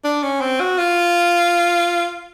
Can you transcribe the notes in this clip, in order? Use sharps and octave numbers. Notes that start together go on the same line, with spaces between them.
D4
C#4
C4
F#4
F4